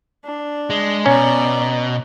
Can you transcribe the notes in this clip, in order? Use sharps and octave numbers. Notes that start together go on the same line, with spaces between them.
D4
G#3
B2 C#4 D5 A#5